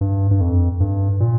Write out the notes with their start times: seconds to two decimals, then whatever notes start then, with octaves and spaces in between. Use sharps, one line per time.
0.01 G2
0.31 G2
0.41 F2
0.80 G2
1.20 A#2